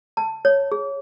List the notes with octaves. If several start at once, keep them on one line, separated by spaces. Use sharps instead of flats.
A5
C#5
G#4